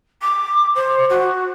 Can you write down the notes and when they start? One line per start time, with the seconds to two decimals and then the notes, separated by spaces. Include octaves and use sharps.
0.22 D6
0.75 C5
1.09 F#4